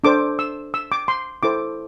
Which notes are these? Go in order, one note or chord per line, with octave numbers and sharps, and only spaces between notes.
D4 A4 C5 D6
E6
E6
D6
C6
E4 A4 C5 D6